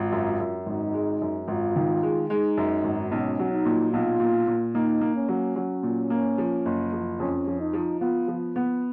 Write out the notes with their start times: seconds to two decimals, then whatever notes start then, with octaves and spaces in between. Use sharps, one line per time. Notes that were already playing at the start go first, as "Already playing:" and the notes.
Already playing: G#1 F4
0.12 F#2
0.40 F#2
0.66 G#1 D#4
0.94 G#3
1.21 F#2
1.48 G#1 F4
1.76 D#3
2.03 G#3
2.29 G#3 D#4
2.57 F#2
2.84 G#1
3.11 B1 C#4
3.39 F#3
3.52 D#4
3.65 A#2
3.93 B1 F4
4.20 A#2
4.47 A#2
4.75 A#3 D#4
5.01 A#3
5.15 C#4
5.28 F#3
5.56 F#3
5.83 A#2
6.10 A#3
6.38 F3
6.65 F#1
6.93 F3
7.19 F2 C#4
7.47 F3
7.60 D#4
7.73 F3
8.00 B3 F4
8.28 F3
8.56 B3